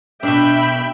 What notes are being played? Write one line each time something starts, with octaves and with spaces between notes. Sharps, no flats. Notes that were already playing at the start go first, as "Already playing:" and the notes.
B2 D4 E5 G5 B5